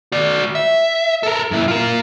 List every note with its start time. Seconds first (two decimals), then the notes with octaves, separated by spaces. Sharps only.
0.12 F#4 D5
0.55 E5
1.23 A4 A#4
1.51 F#2 E4
1.68 F4 A#4